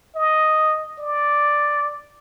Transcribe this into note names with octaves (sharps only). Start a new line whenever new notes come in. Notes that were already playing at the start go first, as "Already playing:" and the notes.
D#5
D5